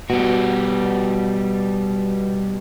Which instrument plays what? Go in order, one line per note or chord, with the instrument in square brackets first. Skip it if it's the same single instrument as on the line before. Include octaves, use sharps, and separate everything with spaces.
[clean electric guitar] B2 [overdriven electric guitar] G3 F#4